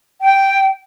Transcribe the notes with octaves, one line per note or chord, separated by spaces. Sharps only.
G5